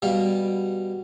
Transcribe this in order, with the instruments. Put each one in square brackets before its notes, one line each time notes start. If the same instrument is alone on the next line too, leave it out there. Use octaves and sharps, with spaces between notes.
[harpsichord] B2 G3 F5